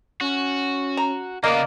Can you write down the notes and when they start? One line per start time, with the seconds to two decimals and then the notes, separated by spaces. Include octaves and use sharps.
0.21 C#4 F#4
0.97 A#5
1.44 C#3 A#3 B3 A#4 D5 D#5